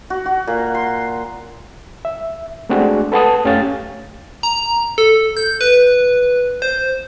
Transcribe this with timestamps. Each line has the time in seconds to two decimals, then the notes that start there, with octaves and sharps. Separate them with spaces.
0.10 F#4
0.26 F#4
0.47 A#2
0.75 C6
2.05 E5
2.69 G#3 A3 C4 D4 F#4 G#4
3.12 A4 B4 F#5 A5 D#6
3.44 F#2 A3 C#4 G4 F5 A6
4.43 A#5
4.98 A4
5.37 G6
5.61 B4
6.62 C5